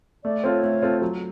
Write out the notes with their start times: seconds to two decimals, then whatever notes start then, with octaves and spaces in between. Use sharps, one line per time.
0.24 A3 D5
0.44 C4 F4 A4 C#5
0.63 A3
0.82 C4 F4 A4
1.02 F#3